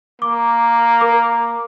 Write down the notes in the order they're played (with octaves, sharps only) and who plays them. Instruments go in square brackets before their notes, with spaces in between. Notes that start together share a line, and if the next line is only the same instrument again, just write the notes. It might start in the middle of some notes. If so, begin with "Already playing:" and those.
[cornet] A#3 [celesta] D6
[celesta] A#4 D6